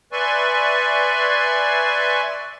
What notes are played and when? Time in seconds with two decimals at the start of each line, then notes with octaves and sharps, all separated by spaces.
0.12 B4 D5 E5 G#5 C6 C#6